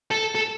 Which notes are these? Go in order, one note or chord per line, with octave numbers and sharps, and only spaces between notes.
A4
A4